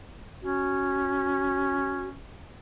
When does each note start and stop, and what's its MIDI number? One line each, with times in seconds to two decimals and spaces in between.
0.43 2.22 61
0.43 2.08 66